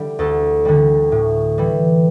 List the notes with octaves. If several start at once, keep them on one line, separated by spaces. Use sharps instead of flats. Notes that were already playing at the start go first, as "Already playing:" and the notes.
Already playing: D3 G3 E4 G4
D2 A4
D3 G3
A2
E3 G3